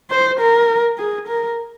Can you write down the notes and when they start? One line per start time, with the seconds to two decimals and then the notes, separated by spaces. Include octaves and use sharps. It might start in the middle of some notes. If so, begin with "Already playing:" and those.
0.11 C5
0.39 A#4
0.98 G#4
1.27 A#4